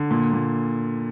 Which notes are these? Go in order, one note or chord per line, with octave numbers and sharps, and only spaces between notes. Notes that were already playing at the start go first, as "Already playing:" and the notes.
Already playing: D3
A#2
A#2